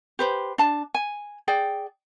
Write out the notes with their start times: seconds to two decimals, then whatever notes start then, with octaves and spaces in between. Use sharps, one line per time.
0.19 G4 B4 C5
0.58 D4 A5
0.94 G#5
1.48 G#4 D5 G5